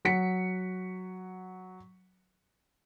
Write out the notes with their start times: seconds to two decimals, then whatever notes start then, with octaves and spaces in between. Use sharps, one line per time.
0.05 F#3 F#5 B6 C#7